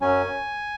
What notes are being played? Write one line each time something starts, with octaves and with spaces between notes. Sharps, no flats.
F#2 F#3 C#4 G#5